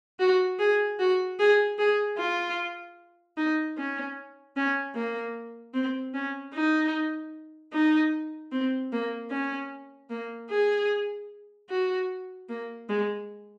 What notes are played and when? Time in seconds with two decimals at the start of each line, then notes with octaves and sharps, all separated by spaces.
0.19 F#4
0.59 G#4
0.99 F#4
1.39 G#4
1.78 G#4
2.18 F4
3.37 D#4
3.77 C#4
4.56 C#4
4.95 A#3
5.74 C4
6.14 C#4
6.54 D#4
7.73 D#4
8.52 C4
8.92 A#3
9.31 C#4
10.10 A#3
10.50 G#4
11.70 F#4
12.49 A#3
12.89 G#3